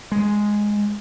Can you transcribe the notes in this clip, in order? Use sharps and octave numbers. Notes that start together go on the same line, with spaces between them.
G#3